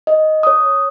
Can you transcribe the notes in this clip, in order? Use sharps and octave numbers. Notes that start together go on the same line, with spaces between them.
D#5
C#5 D#6